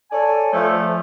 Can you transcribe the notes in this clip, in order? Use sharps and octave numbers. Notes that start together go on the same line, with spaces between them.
A4 C#5 D5 G#5
F3 A3